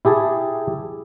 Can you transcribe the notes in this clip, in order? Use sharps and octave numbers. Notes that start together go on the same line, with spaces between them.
E4 G4 G#4 A5